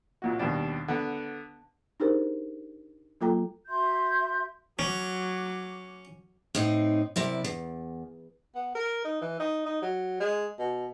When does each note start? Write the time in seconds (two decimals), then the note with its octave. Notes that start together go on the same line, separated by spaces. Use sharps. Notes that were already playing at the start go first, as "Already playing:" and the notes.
0.22 C2 A#2 F#4
0.39 D#2 B2 G3 D4
0.88 D3 B3
2.00 D4 D#4 G4 G#4 A#4 C5
3.21 F#3 A#3 F4 A4 G5 A#5
3.67 F#4 E5 C6 G6
4.79 F#3 C#4 D6
6.55 A2 C4 D#4
7.16 F#2 C3 E4 D5
7.44 E2
8.55 B3
8.75 A#4
9.05 D#4
9.21 E3
9.40 D#4
9.66 D#4
9.82 F#3
10.20 G#3
10.59 B2